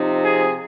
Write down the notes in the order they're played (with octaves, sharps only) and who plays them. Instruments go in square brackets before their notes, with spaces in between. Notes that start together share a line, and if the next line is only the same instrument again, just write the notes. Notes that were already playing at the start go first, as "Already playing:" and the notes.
Already playing: [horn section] C3 F3 C4 D#4
G#4